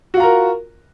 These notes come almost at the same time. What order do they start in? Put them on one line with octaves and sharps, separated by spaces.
F#4 F4 A#5 A#4